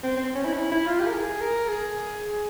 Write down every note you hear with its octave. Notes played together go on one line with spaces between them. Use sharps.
C4
C4
C#4
E4
C#4
E4
E4
F4
G4
A#4
G#4
A#4
G#4